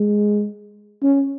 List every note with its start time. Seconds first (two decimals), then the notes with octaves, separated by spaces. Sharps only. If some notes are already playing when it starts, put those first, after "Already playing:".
Already playing: G#3
1.03 C#4